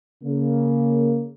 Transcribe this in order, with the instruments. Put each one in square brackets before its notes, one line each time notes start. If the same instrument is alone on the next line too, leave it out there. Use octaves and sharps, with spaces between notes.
[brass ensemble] C#3 A#3